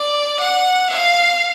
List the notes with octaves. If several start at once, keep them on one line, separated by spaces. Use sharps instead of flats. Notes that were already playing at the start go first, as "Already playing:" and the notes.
Already playing: D5
F#5
F5